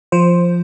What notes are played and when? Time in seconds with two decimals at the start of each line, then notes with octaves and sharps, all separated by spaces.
0.12 F3 C5